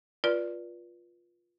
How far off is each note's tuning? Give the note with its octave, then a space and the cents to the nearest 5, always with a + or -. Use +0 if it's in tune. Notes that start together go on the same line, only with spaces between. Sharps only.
F4 +0 B4 -30 D5 +0